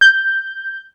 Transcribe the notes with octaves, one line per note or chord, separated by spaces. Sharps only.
G6